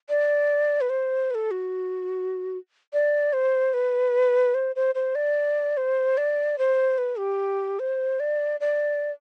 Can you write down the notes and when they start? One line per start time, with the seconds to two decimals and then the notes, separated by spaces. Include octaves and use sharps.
0.09 D5
0.81 B4
0.90 C5
1.31 B4
1.35 A4
1.51 F#4
2.93 D5
3.33 C5
3.74 B4
4.54 C5
4.76 C5
4.95 C5
5.15 D5
5.77 C5
6.17 D5
6.58 C5
6.98 B4
7.18 G4
7.79 C5
8.20 D5
8.60 D5